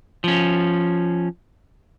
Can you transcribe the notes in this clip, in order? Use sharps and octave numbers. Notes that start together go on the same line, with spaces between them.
F3 C#4